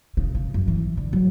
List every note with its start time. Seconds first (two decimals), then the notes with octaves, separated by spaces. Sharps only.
0.17 C#3
0.35 C#3
0.54 F#2
0.68 E3
0.97 D3
1.13 F#3